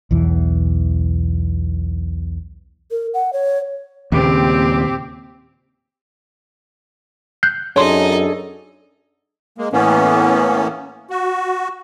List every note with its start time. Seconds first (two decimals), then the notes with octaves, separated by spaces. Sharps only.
0.11 B1 E2 E3
2.91 A#4
3.14 F#5
3.33 C#5
4.12 D#2 A#2 C#3 C4 G4
7.43 F#6 G6 C7
7.76 F#2 D4 D#4 G#4 A4 C#5 C6
9.58 G#3 A#3
9.73 A2 E3 A#3 B3 C#4
11.10 F#4